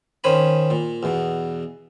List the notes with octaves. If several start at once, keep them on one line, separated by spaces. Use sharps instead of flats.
D#3 C#4 C5 G#5 B5
A#2
E2 B2